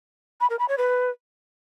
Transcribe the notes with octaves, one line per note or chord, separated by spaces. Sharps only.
B5
A#4
B5
C#5
B4